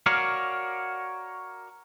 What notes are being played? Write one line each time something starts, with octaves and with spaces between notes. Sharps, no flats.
F#4 A#4 C#5 D5 F5